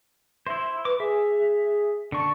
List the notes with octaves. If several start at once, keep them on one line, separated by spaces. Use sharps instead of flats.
E4 C5 E5
B4 D6
G#4 E5
D3 A5 C#6